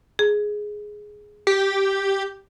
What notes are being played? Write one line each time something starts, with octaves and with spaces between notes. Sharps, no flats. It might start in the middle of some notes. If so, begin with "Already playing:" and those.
G#4
G4